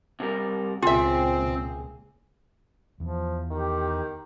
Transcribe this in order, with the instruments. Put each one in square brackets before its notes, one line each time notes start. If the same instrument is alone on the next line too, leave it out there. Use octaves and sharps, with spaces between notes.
[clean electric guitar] C3 G3 A#4
[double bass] C#2 A#2 [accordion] C4 [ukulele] F4 E5 [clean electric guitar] G#4
[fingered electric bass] E2 [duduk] F3
[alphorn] D#3 [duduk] G4